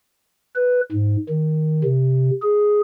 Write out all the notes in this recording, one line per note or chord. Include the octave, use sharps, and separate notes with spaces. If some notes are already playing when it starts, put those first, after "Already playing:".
B4
G#2
D#3
C3
G#4